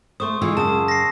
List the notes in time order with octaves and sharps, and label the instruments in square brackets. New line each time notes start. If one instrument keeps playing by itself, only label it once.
[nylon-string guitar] A3 C5 [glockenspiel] C6 C#6 D#6
[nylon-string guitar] E3 G#3 F4 [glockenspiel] E6
[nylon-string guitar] F#2 C#3 [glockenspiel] A5 D#6
[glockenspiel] A#6 C7